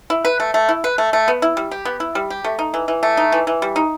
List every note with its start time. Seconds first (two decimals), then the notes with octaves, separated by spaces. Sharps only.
0.10 E4
0.25 B4
0.40 A3
0.54 A3
0.69 E4
0.84 B4
0.98 A3
1.13 A3
1.28 B3
1.42 E4
1.57 G3
1.71 G4
1.85 B3
2.00 E4
2.15 G3
2.30 G4
2.44 A3
2.59 D#4
2.74 E3
2.88 E3
3.03 A3
3.17 D#4
3.32 E3
3.47 E3
3.62 G3
3.76 D#4